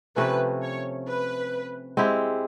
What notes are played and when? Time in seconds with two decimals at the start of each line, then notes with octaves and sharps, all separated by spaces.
0.16 C3 F3 A3 C#4 B4
0.62 C#5
1.07 B4
1.97 G#3 C4 E4 G4